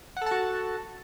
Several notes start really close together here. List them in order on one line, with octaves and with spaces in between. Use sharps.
F#5 A4 A5 F#4